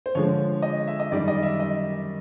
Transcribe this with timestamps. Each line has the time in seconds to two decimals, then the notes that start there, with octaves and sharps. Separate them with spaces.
0.06 C5
0.15 D3 F3 G#3 C#5
0.62 D#5
0.87 E5
1.00 D#5
1.11 F#2 D#3 G3 D5
1.28 D#5
1.43 E5
1.60 D#5